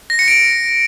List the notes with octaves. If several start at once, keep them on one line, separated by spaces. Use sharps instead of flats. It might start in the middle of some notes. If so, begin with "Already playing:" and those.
A#6
C#7
D7